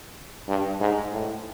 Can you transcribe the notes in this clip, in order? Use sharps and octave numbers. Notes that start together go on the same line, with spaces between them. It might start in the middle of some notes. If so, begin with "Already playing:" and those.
G2
G#2
A2